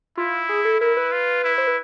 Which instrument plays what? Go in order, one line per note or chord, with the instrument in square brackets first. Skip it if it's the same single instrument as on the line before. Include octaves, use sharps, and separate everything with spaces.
[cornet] E4 [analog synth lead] F4
[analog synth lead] G#4
A4
[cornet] E4 [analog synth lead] A#4
[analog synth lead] B4
[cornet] F4
E4
[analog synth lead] C5
B4